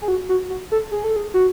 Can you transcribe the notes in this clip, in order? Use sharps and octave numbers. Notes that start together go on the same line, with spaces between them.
G#4
F#4
F#4
F#4
A4
G#4
A4
G#4
F#4